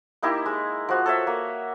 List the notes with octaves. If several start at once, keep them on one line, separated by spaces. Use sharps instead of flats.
A#3 D#4 E4 G4
G#3
F3 F#4
A4 C#5 E5
A#3